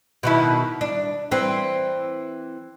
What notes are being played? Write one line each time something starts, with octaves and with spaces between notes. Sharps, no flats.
B2 D#3 E4
D4
E3 C4